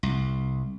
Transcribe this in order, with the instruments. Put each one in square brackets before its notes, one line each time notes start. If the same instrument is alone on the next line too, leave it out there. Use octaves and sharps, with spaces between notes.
[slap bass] C2